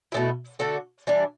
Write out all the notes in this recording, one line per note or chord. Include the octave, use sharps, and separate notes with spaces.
B2 A3 C4 E4
D3 A3 D4 F#4
E3 G3 D4